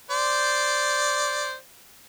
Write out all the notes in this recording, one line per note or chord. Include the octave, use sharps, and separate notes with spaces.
C5 D5